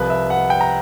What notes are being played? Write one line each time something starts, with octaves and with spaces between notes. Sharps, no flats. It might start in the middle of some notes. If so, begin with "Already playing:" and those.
Already playing: C2 C3 F3 B4
E5
F#5
G5
A#5